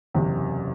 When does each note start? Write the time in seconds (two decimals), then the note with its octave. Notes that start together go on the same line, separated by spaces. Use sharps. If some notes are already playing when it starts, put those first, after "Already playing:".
0.14 F#1 E2 C3